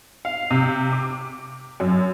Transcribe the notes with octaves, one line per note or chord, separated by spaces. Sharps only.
F5
C3
D6
F#2